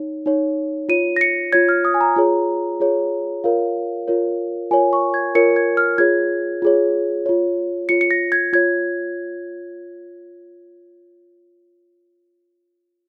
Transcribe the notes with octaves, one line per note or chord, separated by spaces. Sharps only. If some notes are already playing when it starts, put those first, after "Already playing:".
Already playing: D#4 C#5
D#4 C#5
F4 C#5 D#7
A#6
C#7
F4 C#5 G#6
F6
D#6
G#5
A#5
F4 G#4 C#5
F4 G#4 C#5
F4 A#4 C#5 F5
F4 A#4 C#5
F4 A#4 C#5 G#5
C#6
G#6
F4 A#4 C#5 C#7
G#6
F6
F4 G#4 C#5 G#6
F4 G#4 C#5
F4 C#5
F4 C#5 C#7
C#7
A#6
G#6
F4 C#5 G#6